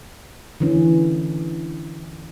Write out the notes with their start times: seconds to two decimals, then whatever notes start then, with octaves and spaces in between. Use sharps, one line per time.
0.60 D3 E3 C#4